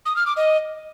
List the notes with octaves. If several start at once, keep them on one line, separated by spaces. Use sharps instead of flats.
D#6
F6
D6
D#5